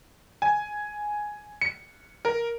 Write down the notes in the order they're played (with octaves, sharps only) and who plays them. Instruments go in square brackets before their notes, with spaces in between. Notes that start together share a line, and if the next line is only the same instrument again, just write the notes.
[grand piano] G#5
C#7
A#4